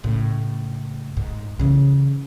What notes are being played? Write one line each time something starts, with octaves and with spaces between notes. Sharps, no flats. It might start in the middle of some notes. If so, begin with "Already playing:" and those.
A2 C#3
G#2
C#3 E3